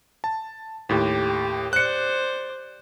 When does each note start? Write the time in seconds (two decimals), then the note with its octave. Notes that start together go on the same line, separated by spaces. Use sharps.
0.24 A5
0.89 D#2 A2 G4
1.73 C5 D5 F#6 C#7